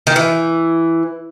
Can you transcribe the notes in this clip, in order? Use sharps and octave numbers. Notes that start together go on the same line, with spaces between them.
D#3
E3